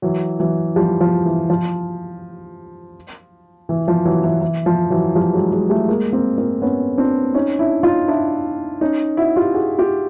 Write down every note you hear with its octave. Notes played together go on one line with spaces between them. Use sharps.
E3 F#3
E3 F#3
F3 G3
F3
E3
F3
E3
F3
E3 F#3
E3
E3
F3
E3 F#3
F3 G3
F#3 G#3
F#3 G#3
G3 A3
G#3 A#3
A#3 C4
A#3 C4
B3 C#4
C4 D4
C#4 D#4
D4 E4
D#4 F4
D4 E4
C#4 D#4
E4 F#4
F4 G4
F#4 G#4
F4 G4